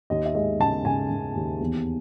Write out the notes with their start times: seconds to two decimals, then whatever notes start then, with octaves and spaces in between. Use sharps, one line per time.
0.10 D#2 D#5
0.25 E5
0.35 G#3 D#5
0.60 C#3 A5
0.85 C#3 G#5
1.11 C#3
1.36 D#2
1.60 E2